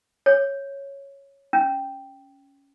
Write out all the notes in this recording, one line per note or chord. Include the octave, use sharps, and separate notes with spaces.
C#5
C#4